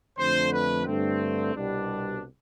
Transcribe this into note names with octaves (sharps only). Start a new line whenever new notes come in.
F2 D3 A3 C5
B4
G2 D3 A3 C4
C2 B2 G3 D4